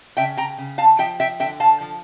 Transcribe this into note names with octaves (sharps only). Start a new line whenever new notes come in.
C#3 E5 G5
G5 A#5
C#3
F5 A5
F3 E5 G5
E5 G5
D3 E5 G5
F5 A5
F3